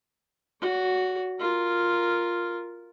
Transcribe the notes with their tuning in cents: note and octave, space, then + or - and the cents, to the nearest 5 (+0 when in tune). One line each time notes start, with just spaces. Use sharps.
F#4 +0 C#5 +45
F4 +0 A#4 +0